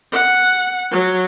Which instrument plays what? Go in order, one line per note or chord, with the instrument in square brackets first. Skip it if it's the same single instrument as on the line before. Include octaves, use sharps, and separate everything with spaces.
[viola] F#5
F#3